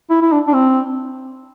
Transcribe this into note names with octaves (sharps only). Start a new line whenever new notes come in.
E4
E4
D4
D4
C4